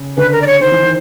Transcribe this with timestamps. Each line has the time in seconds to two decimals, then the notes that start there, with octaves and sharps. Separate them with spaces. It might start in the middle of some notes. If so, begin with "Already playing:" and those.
Already playing: C#3
0.17 D3 B4
0.32 A#4
0.42 D5
0.47 C#5
0.61 D#3 C5
0.72 E3
0.83 D#3